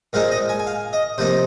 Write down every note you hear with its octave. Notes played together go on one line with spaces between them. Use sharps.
A#2 G#3 C4 D#4 F5
D#5
G#5
G#5
F5
D#5
C3 F3 A#3 D#4 C5